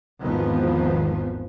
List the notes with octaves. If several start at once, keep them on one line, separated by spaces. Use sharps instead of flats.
G#1 E2 G#2 D#3 F3 B3